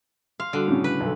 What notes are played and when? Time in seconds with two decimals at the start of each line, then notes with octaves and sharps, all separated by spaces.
0.40 F5 C6
0.53 D3 G3 F#4
0.68 A2 C#3
0.84 B4
1.00 B1 A4